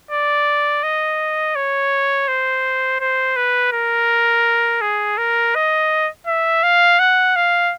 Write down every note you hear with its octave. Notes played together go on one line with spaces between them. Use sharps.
D5
D#5
C#5
C5
C5
B4
A#4
G#4
A#4
D#5
E5
F5
F#5
F5